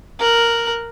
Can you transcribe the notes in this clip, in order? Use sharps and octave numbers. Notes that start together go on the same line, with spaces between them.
A#4 F#6